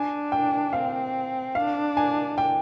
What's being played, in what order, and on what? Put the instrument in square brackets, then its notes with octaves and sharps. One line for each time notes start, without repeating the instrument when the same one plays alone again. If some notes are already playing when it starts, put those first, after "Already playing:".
Already playing: [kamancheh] D4 [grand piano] G#5
[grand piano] G5
[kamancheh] C4 [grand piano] F5
[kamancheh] D4 [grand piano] F5
[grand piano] G#5
G5